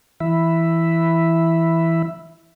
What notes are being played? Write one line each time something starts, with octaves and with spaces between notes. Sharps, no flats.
E3 E5 B5